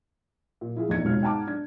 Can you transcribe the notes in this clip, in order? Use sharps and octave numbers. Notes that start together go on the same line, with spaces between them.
A#2
F3 E4 F4 G#4
F1 A#1 E2 D#4 G#6 C#7
E1 C#2 G#2 B2 F6
G#2 F#5 G5 A5 A#5 D6
D4 G#6